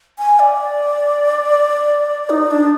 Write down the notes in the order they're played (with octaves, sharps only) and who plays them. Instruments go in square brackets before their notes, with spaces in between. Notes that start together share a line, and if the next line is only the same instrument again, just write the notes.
[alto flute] G#5
D5
D#4
D4